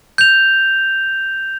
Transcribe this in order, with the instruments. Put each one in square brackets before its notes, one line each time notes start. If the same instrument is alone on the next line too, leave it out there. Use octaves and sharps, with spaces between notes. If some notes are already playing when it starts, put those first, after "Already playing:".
[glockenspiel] G6 F7